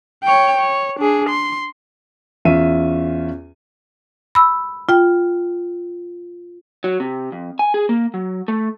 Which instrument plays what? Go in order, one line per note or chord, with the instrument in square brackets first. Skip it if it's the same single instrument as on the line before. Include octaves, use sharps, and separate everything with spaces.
[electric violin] C#5 G5
C#5
D4 G#4
C6
[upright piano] E2 C#4 F4 E5 D#7
[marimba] B5 E6
F4 G5
[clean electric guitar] F#3
C3
F2
G#5
G#4
A#3
F#3
A3